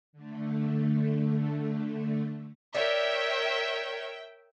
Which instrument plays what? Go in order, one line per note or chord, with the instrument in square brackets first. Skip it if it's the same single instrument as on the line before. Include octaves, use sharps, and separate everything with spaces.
[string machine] D3 A3
[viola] A#4 C#5 [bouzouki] D5 [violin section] E5 G5